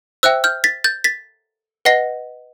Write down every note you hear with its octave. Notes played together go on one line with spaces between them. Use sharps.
C5 E5 G5 E6 F#6
F6 G6
A6 B6
G6 A6
A6 B6
B4 D#5 F#5 A#6 C7